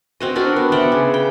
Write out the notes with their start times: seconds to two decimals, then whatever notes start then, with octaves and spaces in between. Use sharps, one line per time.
0.20 C4 F#4 D#5
0.35 D4 F#4 A#4 D5
0.56 B3
0.72 D5 E5 F#5 G5
0.92 C#3
1.14 G5